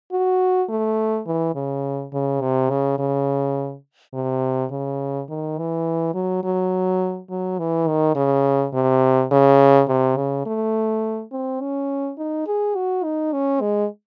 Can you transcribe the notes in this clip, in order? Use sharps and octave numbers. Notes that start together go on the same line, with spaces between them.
F#4
A3
E3
C#3
C#3
C3
C#3
C#3
C3
C#3
D#3
E3
F#3
F#3
F#3
E3
D#3
C#3
C3
C#3
C3
C#3
A3
C4
C#4
D#4
G#4
F#4
D#4
C#4
G#3